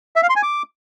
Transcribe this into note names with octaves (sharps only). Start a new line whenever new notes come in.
E5
F5
C6
G#5
D6